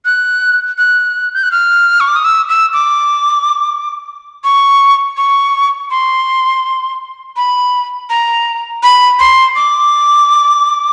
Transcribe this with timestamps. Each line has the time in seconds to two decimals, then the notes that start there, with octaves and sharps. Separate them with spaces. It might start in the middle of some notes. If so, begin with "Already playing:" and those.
0.05 F#6
0.78 F#6
1.34 G6
1.43 F#6
1.52 F6
2.00 C#6
2.08 D6
2.16 D#6
2.25 E6
2.49 E6
2.73 D6
4.44 C#6
5.17 C#6
5.91 C6
7.36 B5
8.10 A#5
8.83 B5
9.19 C6
9.56 D6